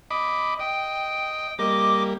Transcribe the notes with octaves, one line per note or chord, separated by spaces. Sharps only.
D#5 B5 D6
D#5 G5
G3 A#3 D#5 D6